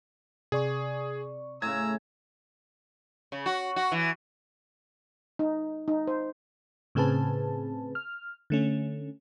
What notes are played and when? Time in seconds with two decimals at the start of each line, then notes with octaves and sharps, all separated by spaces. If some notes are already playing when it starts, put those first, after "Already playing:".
0.52 C3 G#4 D5 C#6
1.62 A2 C#3 A#5 E6 G#6
3.32 C#3
3.46 F#4
3.76 F#4
3.92 E3
5.39 D#4
5.88 D#4
6.08 C5
6.95 A2 C#3 C4 G#4 B4 A5
7.95 F6
8.50 D3 A3 C#4